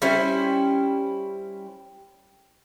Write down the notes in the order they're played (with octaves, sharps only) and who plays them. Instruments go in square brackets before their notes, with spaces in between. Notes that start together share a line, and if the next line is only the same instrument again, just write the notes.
[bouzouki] G3 C#4 E4 C5